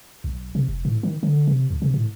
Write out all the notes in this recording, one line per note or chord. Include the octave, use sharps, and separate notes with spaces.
B1
C3
F1
A2
D#3
D3
C3
D2
C3
A2